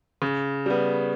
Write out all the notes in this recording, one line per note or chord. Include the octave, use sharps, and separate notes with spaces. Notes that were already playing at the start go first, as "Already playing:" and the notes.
C#3
G3 B3